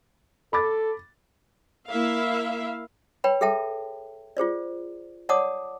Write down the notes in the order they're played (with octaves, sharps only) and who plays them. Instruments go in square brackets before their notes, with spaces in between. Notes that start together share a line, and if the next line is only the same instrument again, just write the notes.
[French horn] A4 [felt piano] B5 D6 A6
[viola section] A#3 E4 E5 F5
[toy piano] B4 C#5 G5 B5
G#4 A4 E5 G5 A5
F4 G#4 C5 D5
C#5 D5 F#5 A5 D6 D#6